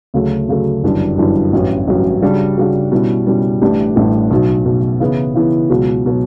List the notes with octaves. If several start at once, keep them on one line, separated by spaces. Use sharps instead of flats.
D2 C#3 F#3 A3
D2 C#3 F#3 A3
G1 F#2 E3 G3 D4
G1 F#2 E3 G3 D4
A1 G2 F#3 C#4 F#4
A1 G2 F#3 C#4 F#4
C#3 G3 D4 F#4
C#3 G3 D4 F#4
B2 G3 C#4 E4
B2 G3 C#4 E4
A1 A2 G3 D4 G4
A1 A2 G3 D4 G4
B1 B2 F#3
B1 B2 F#3
C#3 E3 B3 E4
C#3 E3 B3 E4
C#2 B2 F#3
B2 F#3